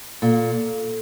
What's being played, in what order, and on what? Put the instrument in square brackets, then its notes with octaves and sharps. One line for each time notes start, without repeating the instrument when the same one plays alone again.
[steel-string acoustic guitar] A#2 [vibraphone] A4